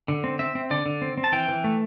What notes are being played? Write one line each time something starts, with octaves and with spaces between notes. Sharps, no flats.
D3
C4
C4 E5
C4
D3 D5
D3
C4
C4
A5
E3 G5
E3
A3